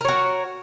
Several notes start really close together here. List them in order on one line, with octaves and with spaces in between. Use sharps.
A#4 C#5 F#4